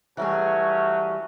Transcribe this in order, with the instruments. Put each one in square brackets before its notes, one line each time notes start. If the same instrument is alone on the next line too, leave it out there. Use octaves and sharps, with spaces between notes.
[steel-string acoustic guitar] E3 G3 G#4 [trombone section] F#3 A3 C#4 [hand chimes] E5 F#6